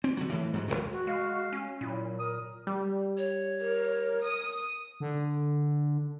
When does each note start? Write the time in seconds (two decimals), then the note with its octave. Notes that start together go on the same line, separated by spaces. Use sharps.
0.04 C4
0.17 D3 F#3
0.30 A2 E3
0.53 G#2 F#3
0.68 G1 F#2 F3 G#3
0.91 F#4
1.07 G#3 F5
1.53 C#4
1.81 A#2 F#3 E4
2.19 A#4 D#6
2.67 G3
3.17 C#5
3.60 A#4
4.23 D#6
5.00 D3